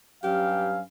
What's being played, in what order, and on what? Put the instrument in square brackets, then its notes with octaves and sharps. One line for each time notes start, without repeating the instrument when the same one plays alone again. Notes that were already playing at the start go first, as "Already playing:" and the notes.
[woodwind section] G2 F#3 C#4 [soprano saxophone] G4 [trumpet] F5